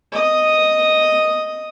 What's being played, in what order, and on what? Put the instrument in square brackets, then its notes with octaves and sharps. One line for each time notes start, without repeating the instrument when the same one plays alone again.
[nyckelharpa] D#5 D#6